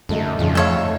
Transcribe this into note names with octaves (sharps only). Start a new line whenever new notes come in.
F#2 D3 A3 D#4
F2 A#2 C#3 F3
A3 D#4 A4 C#5 F5